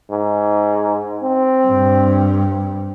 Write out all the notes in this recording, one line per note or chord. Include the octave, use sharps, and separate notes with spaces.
G#2
C4
G2